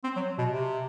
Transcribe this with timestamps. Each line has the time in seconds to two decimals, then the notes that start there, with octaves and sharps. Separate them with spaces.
0.04 C4
0.16 F#3
0.38 B2
0.50 C3